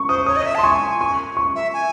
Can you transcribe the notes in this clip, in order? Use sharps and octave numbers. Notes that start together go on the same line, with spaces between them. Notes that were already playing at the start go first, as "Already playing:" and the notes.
Already playing: C#6
C5 D#6
C#5 D#6
D#5
E5
A5
C6
G#5 C#6
C#6
C#6
E5
G#5